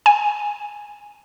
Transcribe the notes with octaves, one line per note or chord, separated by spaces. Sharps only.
G#5